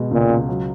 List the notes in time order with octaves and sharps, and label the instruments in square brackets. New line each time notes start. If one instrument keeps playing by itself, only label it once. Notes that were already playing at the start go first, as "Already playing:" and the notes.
Already playing: [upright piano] B2 G#3
[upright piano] C#2 [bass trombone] A#2
[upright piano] C#2
F#3